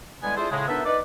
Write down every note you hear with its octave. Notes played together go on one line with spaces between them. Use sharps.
D3 E3 G3 G#3 B3 G#5
D4 E4 F4 G#4 A4 C5
A2 C#3 G#3
A#2 B3 D4 D#4 A4 E5
D#4 B4 D5